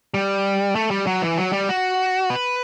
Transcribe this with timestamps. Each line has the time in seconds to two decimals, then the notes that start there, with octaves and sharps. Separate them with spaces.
0.14 G3
0.75 A3
0.91 G3
1.07 F#3
1.22 E3
1.38 F#3
1.53 G3
1.69 F#4
2.30 B4